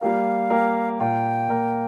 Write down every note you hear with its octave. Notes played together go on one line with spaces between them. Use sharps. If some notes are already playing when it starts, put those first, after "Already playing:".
G3 A#3 G4 A#4 F5
G3 A#3 G4 A#4
A#2 A#3 F4 A#4 G5
A#2 A#3 F4 A#4